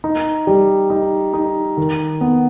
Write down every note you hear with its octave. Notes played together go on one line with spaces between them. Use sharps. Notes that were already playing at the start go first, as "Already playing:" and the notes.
D#4
G3
D#4
D#4
D#3
B3